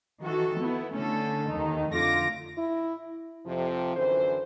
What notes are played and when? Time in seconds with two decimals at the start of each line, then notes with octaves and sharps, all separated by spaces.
0.24 D#3 E3 F#4 A4
0.59 B3 E4
0.94 D3 A3 C#4 A4
1.49 D#2 D#3 D#4
1.92 F2 D3 A3 F4 D6 A#6
2.58 E4
3.46 F2 C3 F3
3.96 F#2 D3 E3 C5